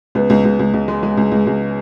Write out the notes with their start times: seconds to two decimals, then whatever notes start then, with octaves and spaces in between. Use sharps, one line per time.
0.15 C#2 B3
0.30 C#2
0.45 C#2
0.59 C#2
0.73 C#2
0.88 G#3
1.03 G#3
1.17 C#2
1.32 C#2
1.47 C#2